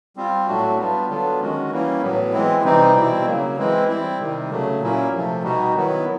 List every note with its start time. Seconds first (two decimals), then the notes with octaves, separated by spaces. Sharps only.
0.16 G3 C4 F4
0.47 A2 F#3 A3 D4 F#4
0.77 G3 B3 D4 F4
1.09 D3 F#3 B3 D4 F4
1.39 D#3 G#3 C#4 F#4
1.70 E3 G3 A#3 C#4 E4
2.02 A2 F#3 B3
2.32 E3 G#3 C4 E4
2.63 C3 E3 G3 C4 D#4
2.95 B2 G3 C4 E4
3.25 C#3 F#3 A#3
3.57 E3 G#3 C4 E4
3.88 G3 C4 E4
4.19 C3 D#3 G3
4.49 C#3 F#3 A3
4.80 A#2 F#3 A#3 C#4 E4
5.12 C3 F3 A3
5.43 B2 G3 B3 D#4 F#4
5.74 D#3 F#3 B3 E4